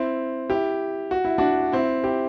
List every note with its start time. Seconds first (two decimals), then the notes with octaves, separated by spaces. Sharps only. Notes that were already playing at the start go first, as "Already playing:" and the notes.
Already playing: C4 E4
0.50 E4 G4
1.11 F#4
1.25 E4
1.38 D4 F#4
1.72 C4 E4
2.03 E4 G4